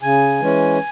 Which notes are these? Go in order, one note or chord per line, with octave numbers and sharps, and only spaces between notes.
C#3 G#5
E3 G#3 C#4